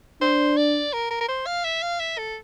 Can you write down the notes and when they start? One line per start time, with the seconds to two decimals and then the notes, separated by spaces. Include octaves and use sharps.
0.21 D4 C5
0.57 D5
0.93 A#4
1.11 A#4
1.21 A#4
1.28 C5
1.46 F5
1.65 E5
1.82 F5
2.00 E5
2.18 A4